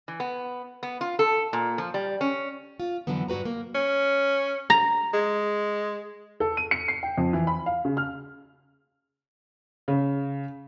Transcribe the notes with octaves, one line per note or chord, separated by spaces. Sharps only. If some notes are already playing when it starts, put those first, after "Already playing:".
E3
B3
B3
F4
A4
A#2
F3
G3
C#4
F4
F2 A#2 D3 E3 F#3 B3
G2 F#3 F#4 B4 A#5
A#3
C#4
A#5
G#3
A4
D#7
C#7
C7
G5
F2
E3
B5
F5
C#3
F6
C#3